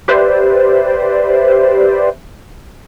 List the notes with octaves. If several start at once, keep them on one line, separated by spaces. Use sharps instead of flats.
G4 B4 C5 D5 E5